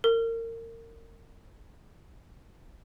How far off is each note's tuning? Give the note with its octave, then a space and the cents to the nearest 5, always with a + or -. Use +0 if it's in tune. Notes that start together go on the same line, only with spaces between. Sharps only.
A#4 -30